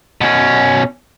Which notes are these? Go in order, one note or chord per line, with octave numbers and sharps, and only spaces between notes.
B2 C#4